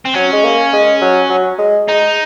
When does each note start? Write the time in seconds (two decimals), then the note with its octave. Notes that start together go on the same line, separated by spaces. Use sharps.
0.06 C4
0.15 F#3 C#4
0.33 G#3
0.44 A#3
0.73 G#3
1.01 F#3
1.29 F#3
1.59 G#3
1.88 G#3 D#4